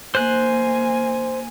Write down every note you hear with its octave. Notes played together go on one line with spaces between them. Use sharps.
A#3 C5 G#5 F#6